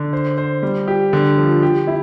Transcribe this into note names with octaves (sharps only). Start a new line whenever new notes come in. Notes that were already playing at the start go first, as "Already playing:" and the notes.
Already playing: D3
C5
C5
G3
G4
D3
F3
G4
E4